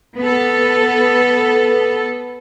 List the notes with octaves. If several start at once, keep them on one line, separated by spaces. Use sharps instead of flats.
B3 A4